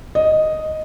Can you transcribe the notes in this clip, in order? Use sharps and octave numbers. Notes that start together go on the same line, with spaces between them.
D#5